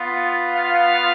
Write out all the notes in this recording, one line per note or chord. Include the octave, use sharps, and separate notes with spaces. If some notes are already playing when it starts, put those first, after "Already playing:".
Already playing: B3 F4
F5